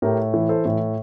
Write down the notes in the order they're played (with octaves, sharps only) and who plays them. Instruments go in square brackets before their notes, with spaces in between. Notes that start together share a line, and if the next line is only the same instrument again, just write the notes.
[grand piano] A2 G4 A#4
E3
A4 C5
A2